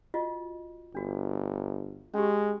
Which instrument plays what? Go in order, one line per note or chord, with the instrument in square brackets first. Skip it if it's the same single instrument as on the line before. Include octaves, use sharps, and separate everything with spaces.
[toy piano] F4 F#4 D#5
[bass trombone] G1 [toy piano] D4 F#4
[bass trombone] G#3 [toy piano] C#4 G4